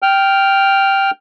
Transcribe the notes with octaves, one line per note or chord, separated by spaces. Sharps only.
G5 F6